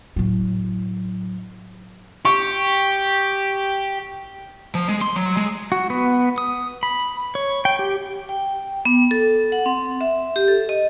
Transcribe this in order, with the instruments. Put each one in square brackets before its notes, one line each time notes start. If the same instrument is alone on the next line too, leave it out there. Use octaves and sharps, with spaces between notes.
[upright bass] A2 F#3
[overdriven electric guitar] G4 [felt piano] C#6
[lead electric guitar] F3
G#3
C6
F#3
G#3
[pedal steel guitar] F#4
B3
D#6
B5
C#5
G5
G4
[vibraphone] G5
B3
A4
F#5
C4
E5
G4
A4
D#5